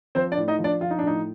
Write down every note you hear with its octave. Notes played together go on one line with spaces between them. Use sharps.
F3 C4 C5
D4 D5
A2
D#4 D#5
F3
D4 D5
F3 F4
D#4
D4
A2 D#4